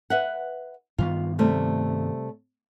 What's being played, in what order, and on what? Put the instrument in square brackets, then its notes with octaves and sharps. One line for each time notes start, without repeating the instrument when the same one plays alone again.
[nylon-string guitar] B4 E5 F#5
[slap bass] G2 D#3 B3 [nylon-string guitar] F4
[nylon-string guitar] C3 G3 A3